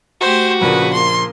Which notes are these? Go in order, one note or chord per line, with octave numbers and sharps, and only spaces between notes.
A3 F#4 G4 C5
A#1 C#3 F3 A#3 B4
A#3 C6